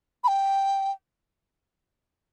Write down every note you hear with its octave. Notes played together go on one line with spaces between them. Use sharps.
B5
G5